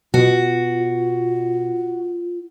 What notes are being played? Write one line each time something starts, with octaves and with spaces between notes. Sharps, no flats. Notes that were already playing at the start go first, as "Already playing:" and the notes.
B2 F4 F#4